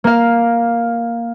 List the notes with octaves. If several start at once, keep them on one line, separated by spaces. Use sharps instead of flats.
A#3 F5